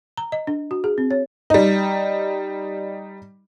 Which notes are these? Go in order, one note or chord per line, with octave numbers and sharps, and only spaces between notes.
A#5
D#5
D4
F#4
G#4
C4
C#5
G3 D#4